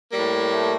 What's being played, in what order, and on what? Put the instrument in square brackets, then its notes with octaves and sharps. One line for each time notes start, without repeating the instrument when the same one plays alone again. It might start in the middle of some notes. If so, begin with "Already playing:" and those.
[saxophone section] A2 G3 A#3
[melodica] A3